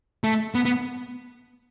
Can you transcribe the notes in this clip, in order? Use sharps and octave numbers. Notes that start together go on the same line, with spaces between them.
A3
B3
B3